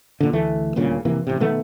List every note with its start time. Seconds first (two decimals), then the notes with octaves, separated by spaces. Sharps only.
0.20 A#2 D3
0.33 D2 E3 A3
0.76 D#1 D2 A#2 C#3
1.05 F1 C3 E3 A#3
1.27 A1 C3
1.40 B2 D#3 A3 B3